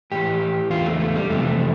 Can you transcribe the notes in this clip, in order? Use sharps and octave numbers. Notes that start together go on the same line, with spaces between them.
A2 E3 G4
E2 D3 F4
A3
A3
G3
F2 C3 E3 A3